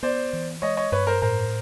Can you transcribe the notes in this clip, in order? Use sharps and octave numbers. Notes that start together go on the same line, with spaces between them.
B3 C5 D5
E3
G#3 C#5 D#5
C#5 D#5
G2 B4 C#5
A#4 C5
A2 A#4 C5